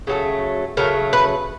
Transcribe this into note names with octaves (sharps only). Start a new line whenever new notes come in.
C#3 F#3 A3
C#3 F#3 A3 A#4
B4